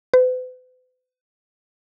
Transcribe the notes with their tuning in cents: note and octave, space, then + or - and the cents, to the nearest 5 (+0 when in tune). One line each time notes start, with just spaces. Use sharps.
B4 +45